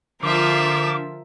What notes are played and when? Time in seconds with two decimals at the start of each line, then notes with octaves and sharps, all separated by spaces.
0.23 D3 F3 F4 A#4 E5 D6